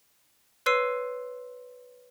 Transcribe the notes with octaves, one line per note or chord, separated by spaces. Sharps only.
B4 C#5 C6 E6 C7 D#7